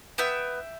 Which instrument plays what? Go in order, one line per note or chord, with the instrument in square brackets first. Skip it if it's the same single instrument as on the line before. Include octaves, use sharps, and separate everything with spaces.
[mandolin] B3 E5 G5